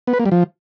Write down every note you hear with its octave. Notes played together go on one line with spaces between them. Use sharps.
B3
B4
A#3
G3
F3